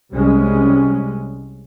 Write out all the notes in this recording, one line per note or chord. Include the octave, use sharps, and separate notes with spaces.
C2 G3 G#3 C#4